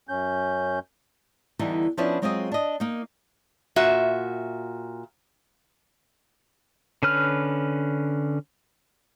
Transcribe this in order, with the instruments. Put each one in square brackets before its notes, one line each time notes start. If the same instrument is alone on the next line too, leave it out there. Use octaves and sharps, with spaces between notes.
[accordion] F#2 C#4 G6
[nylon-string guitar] E2 D3 E3 G3 D#4
F3 B3 C#4 D4 E4 B4
F#3 G#3 C4 F4 G#4 D#5
D4 D#5
A#3 D#4
[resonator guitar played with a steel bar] A#2 F#4 E5
[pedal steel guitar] D3 C#4 B4 F6